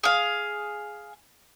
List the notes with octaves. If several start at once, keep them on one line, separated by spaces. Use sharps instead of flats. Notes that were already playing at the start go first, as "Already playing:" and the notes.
G#4 F5